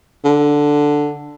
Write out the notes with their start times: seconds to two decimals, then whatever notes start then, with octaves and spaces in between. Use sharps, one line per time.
0.24 D3